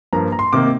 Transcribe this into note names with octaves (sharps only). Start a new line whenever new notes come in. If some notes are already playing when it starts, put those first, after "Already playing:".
G2 F3 A#3 A#5
A#5
C6
C3 D#3 A#3 D6